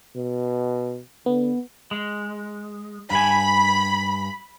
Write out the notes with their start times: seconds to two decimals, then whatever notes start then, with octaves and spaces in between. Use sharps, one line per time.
0.17 B2
1.26 D3 B3
1.91 G#3
3.11 G2 G#5 B5